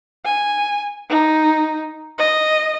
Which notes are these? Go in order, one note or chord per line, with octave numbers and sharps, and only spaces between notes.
G#5
D#4
D#5